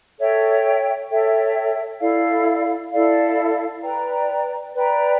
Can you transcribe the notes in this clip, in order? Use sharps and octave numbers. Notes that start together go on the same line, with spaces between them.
A4 C#5 E5 G5
A4 C#5 E5 G5
E4 A4 D5 F5
E4 A4 D5 F5
B4 D5 G5 A#5
B4 D5 G5 A#5